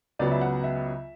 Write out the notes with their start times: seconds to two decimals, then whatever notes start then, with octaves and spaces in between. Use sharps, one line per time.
0.19 C#2 C#3 F#3 B3 D5
0.31 E5
0.41 F#5
0.64 E5